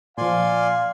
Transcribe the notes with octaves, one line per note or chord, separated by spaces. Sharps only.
A#2 F3 D5 F5 G#5 C6